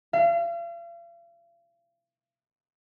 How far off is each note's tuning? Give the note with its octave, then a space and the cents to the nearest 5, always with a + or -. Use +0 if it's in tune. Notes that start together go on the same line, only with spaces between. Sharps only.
F5 -40